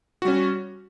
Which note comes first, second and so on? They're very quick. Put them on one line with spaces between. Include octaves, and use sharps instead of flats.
F#4 G3 C#4